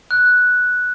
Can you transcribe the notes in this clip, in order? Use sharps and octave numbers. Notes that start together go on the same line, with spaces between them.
F#6